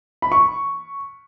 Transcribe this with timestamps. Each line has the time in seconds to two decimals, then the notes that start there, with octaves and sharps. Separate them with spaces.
0.22 B5
0.32 C#6